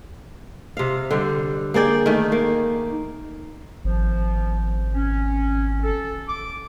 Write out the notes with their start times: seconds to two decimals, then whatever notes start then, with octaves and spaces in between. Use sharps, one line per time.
0.77 C3 F5
1.11 D3 G3
1.74 A#3 G#4 D5 G5
2.06 D#3 A3
2.32 A#3
3.84 G#1 F3
4.94 C#4
5.83 A4
6.28 D6